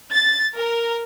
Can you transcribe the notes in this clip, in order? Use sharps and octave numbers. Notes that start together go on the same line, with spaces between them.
A6
A#4